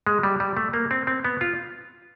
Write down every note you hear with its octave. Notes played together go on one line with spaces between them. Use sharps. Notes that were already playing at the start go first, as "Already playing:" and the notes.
G#3
G3
G3
A3
A#3
C4
C4
B3
F4